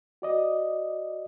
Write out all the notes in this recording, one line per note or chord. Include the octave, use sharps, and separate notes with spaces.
F#4 D5 D#5